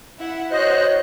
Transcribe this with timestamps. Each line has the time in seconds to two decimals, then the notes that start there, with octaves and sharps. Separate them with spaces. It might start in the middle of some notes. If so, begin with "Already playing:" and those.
0.19 E4 E5 F#5
0.51 F#4 C5 C#5 D#5 F#6